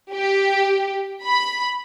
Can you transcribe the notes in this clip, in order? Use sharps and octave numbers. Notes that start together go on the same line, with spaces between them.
G4
B5